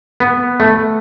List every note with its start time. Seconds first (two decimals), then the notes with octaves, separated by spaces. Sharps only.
0.20 B3
0.60 A3